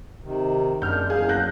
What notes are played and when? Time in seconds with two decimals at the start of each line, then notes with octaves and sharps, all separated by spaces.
0.23 C3 D#3
0.82 F#2 G#3 D4 F6 G6
1.10 E2 G#4 F5
1.29 F#6 G6 A#6